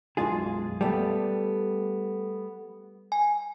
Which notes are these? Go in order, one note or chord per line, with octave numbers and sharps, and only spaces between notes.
B1 F#2 G#3 F4 G#4
G3 A3 B3
G#5